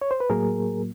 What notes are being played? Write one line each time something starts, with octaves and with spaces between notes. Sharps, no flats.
C#5
C5
B4
A2 F#3 A#3 G#4 A#4